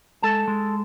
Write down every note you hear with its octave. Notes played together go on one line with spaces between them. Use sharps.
G#3 A4 A5
G#3